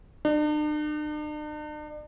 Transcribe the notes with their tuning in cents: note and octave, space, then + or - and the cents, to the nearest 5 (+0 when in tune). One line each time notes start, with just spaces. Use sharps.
D4 +45